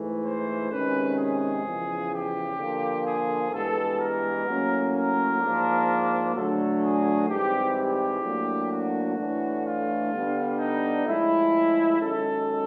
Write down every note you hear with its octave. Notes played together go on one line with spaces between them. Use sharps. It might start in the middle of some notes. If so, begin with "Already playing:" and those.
Already playing: G#2 E3 A3
C5
C3 D#3 G#3 C#4 B4
G#4
E2 C#3 F3
G4
D3 F3 A#3
G#4
G2 E3 G#3 B3 A4
A#4
A2 F#3 A#3 C#4
A#4
G#2 F3 A#3 D4
D3 F#3 A3 D4 A4
G#4
G#2 E3 G3 C4 G4
G4
A2 F#3 A#3 D4
F#4
A2 E3 A3 D4
F4
D3 G3 B3 D4
D#4
A2 F3 G#3 E4
F#2 D#3 G#3 C#4 A4